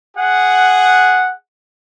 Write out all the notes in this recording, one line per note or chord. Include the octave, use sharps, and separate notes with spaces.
G#4 F#5